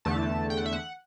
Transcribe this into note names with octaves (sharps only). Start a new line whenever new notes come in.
E2 D3 A3 A5
G5
F#5
E5
F#5